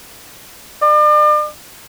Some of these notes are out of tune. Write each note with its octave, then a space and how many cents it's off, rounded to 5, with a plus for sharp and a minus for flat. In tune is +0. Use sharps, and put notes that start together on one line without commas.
D5 +40